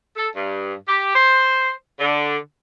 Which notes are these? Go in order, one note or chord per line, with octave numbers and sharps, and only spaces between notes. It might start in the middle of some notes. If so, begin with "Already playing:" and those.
A4
G2
G4
C5
D3